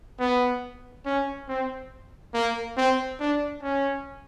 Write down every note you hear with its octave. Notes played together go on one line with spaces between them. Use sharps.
B3
C#4
C4
A#3
C4
D4
C#4